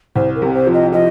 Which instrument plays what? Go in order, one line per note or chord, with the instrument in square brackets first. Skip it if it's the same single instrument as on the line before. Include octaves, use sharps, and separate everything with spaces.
[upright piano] C2 [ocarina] C5
[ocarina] A#4
[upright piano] C3
[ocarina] C5
[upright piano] F3
[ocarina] D#5
[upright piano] F3 [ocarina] D#5